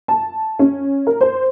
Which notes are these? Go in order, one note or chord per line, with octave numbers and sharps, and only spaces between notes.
A5
C#4
A#4
C5